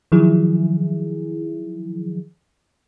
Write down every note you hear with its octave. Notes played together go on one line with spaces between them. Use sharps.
D#3 F3 F#3 E4 G#4